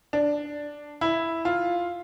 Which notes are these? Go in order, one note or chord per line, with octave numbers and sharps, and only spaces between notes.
D4
E4
F4